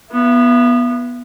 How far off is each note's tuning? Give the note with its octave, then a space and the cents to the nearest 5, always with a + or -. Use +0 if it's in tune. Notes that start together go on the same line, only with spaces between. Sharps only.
B3 -15 E4 +40